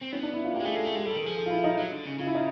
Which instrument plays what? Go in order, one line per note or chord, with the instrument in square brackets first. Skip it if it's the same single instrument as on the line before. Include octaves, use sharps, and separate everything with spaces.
[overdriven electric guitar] C4
[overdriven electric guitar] B3 [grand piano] C#4
[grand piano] D4
E4
F4
[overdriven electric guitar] A#3 [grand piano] G4
[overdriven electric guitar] G#3
[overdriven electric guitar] A3 [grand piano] G#4
[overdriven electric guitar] G#3 [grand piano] A4
[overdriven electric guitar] A3 [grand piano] G#4
[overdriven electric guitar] G#3 [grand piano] G4
[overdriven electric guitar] G3 [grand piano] A4
[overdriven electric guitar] D#3 [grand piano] A4
[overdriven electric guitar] F3 [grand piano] G#4
[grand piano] A4
F4
E4
D#4
[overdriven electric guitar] F#3
D3
C#3
[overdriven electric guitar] C#3 [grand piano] F4
[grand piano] E4
D#4